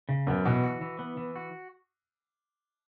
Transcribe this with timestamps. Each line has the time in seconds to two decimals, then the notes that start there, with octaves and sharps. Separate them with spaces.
0.09 C#3
0.27 F#2 B3
0.45 B2 E3
0.64 F#4
0.81 E3
0.99 B3
1.17 E3
1.36 F#4